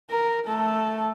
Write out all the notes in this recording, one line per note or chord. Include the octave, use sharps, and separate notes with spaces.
A#4
A3 A4